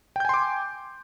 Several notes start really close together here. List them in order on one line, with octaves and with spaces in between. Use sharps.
G5 G6 G#5 C6 D6